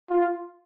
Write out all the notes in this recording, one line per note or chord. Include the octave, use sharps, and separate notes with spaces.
F4